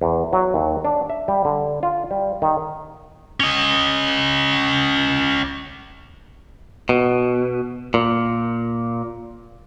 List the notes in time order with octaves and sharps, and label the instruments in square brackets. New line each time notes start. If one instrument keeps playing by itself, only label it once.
[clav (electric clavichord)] E2
F#3
D#2
D4
E5
G3
D3
F4
G3
D#3
[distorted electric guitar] C#4 D#5
[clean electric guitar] B2
A#2